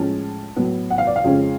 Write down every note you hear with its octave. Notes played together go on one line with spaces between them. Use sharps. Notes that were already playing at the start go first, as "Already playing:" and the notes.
Already playing: A2 F3 G#3 C#4 A5
A2 F#3 B3
F#5
F5
D5
F5
F2 C#3 G#3 C#4